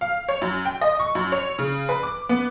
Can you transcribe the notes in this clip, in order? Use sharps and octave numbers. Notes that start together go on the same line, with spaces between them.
F5
C#5
F#2
G5
D#5
C#6
F#2
C#5
C#3
B4
D6
B3